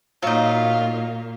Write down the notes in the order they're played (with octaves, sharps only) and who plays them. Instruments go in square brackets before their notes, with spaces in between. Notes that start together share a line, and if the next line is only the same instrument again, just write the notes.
[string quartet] A#2 [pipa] F#3 D#4 [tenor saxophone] F4